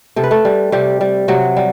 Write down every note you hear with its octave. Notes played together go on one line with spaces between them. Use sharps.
C3 A4
B4
A3 A4
G3
C3 G3 G4
G3
C3 F#3 F#4
G3